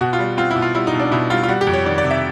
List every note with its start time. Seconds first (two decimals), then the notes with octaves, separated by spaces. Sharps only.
0.01 B2 F#4
0.13 F4
0.19 G3
0.37 C4 F4
0.50 E4
0.56 B2
0.62 F4
0.74 G3 E4
0.87 D#4
0.93 B2
1.00 D4
1.12 B2 E4
1.30 G3 F4
1.43 F4
1.48 G3 F#4
1.61 G4
1.67 F2
1.74 C#5
1.86 D#3 D5
1.98 D5
2.04 C3
2.11 E5